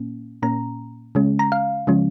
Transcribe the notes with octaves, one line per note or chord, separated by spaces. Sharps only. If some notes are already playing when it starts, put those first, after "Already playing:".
Already playing: A#2 A#3 C#4
A#2 A#3 C#4 A#5
C#3 G#3 C#4
A#5
F5
C#3 F3 G#3 C#4